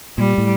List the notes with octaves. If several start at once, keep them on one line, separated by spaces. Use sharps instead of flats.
A#2 G3
A2